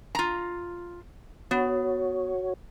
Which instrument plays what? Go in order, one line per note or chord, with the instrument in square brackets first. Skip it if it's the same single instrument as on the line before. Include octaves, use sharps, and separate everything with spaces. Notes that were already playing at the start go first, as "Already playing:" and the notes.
[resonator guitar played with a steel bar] F4 A#5
[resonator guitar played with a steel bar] B3 [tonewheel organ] F#4 C#5